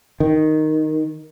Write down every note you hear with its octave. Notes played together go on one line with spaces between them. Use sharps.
D#3